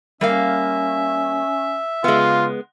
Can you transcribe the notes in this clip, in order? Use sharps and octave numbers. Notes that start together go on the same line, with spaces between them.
G3 A#3 C#4 E5 F5
C#3 G#3 B3 F4